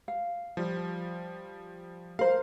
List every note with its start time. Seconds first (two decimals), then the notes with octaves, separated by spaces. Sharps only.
0.08 F5
0.57 F3 G3
2.19 A#4 C5 F5